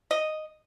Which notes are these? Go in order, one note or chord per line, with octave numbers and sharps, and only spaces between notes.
D#5